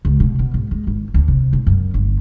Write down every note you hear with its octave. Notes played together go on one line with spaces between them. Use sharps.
C#2
B2
B2
G#1
G#3
G#1
D2
C3
B1
F#2
G1